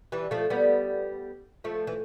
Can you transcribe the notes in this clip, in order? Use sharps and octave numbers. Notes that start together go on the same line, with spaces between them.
E3 G3
F3 A3
G3 B3
F3 A3
E3